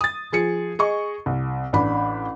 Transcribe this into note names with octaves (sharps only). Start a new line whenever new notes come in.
D#6 A6
F3 G#4 C#7
G#4 D#5 C#6
C2
A1 D4 B5